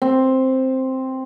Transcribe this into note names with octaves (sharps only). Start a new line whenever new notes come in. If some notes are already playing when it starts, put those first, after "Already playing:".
C4